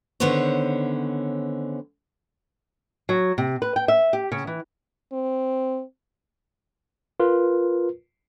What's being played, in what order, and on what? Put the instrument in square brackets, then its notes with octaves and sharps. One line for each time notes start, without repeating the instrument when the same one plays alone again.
[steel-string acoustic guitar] D3 D#3 B3 C#4 C5 C#5
[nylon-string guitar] F#3
C3
B4
G5
E5
G4
C#3
E3
[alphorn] C4
[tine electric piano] F4 A#4 B4